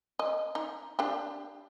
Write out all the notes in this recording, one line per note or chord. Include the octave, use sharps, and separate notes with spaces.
D#5
D#4
D4 G4